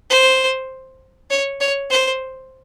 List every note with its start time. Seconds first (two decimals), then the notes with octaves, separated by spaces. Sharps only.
0.10 C5
1.31 C#5
1.61 C#5
1.91 C5